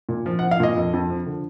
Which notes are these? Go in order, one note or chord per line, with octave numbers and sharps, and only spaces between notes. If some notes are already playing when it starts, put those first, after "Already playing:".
A#2
F3
F#5
F3
F5
A#2 D#5
F2
F2
F3
D3